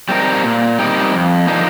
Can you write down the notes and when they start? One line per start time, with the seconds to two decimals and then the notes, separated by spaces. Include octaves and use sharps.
0.09 G3 C4 D#4 A#4
0.44 A#2
0.79 G3 C4 D#4 A#4
1.12 F2
1.47 D3 F3 A#3 D#4